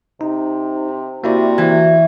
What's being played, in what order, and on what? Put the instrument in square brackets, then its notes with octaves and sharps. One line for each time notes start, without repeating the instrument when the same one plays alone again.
[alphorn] C3 [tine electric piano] D#4
[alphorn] C3 [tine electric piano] A#3 E4 D5 [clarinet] F#4
[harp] E3